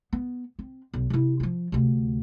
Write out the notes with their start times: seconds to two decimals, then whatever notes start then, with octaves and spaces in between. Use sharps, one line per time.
0.13 B3
0.59 C4
0.93 B1
1.10 C3 E4
1.40 F3 F4
1.72 D2 C3